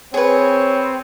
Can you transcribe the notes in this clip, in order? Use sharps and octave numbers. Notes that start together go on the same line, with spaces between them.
C4 G#4 B4 C#5